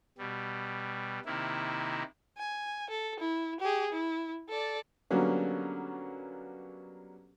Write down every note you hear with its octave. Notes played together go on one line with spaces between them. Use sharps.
B2 G3
C3 D#3 A#3 E4
G#5
A4
E4
G4 G#4
E4
A4 D5
D3 F#3 G3 A#3 B3 C#4